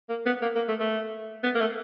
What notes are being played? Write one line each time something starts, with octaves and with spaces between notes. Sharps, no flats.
A#3
B3
A#3
A#3
A3
A3
B3
A#3
A3